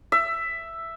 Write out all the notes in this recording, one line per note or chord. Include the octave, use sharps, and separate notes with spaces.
E5